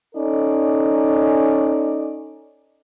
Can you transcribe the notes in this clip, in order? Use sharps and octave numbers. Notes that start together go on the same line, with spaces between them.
C#4 D#4 A4 D5